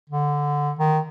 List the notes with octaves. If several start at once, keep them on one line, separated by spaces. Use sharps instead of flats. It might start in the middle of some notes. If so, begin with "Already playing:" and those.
D3
D#3